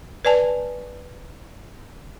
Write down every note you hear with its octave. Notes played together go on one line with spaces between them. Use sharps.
B4 D5 G#5 A5